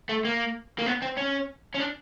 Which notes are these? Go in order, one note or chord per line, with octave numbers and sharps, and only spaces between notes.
A3
A#3
A#3
B3
C4
C#4
C#4
D4